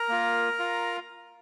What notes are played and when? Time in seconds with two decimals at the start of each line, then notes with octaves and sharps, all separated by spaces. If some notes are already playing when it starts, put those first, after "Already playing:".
Already playing: A#4 A#5
0.09 A#3 F4
0.59 F4